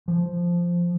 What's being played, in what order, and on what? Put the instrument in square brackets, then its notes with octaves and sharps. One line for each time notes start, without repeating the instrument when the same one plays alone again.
[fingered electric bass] F3